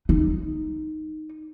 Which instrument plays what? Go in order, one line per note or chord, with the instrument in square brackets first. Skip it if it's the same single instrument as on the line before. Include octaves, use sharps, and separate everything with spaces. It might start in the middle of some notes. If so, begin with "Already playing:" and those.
[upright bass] D#4